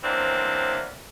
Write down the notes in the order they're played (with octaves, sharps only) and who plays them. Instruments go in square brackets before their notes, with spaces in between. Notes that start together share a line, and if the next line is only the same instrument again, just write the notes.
[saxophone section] C3 E3 F#3 A#3 C4 D4